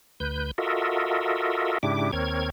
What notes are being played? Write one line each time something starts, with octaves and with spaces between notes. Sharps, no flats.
D2 B4 G6
F4 F#4 A4 A#4 D#5 E5
G#2 C#3 D4 E4 G4 D6
D#2 C4 A#4 C#5 G#6